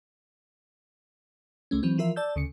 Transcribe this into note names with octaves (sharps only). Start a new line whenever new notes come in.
C#2 A3 C#4
E3 F#3 C4
E3 F3 F4 A#4 E5
D5 A5 E6 G6
D2 C#3 C#7